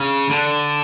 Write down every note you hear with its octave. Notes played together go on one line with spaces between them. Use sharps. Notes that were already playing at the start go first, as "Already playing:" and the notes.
Already playing: C#3
D3